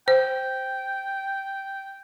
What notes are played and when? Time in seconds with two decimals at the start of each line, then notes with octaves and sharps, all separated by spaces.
0.08 C5 G5